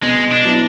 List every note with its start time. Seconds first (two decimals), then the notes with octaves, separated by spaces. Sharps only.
0.02 B2 G#3
0.31 D4
0.45 F#3 B3 E4